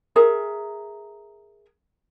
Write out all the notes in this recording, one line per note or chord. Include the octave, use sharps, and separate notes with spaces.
G#4 A#4 E5